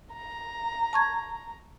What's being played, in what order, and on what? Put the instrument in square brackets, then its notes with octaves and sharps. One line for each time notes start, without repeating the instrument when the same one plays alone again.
[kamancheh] A#5
[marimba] A5 C#6 G#6